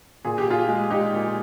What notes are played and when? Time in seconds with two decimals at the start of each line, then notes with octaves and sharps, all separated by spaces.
0.25 A#2 G#4
0.38 G4
0.47 A#2 F4 G#4
0.69 G#3
0.91 G#3 D#4 G4
1.13 A#2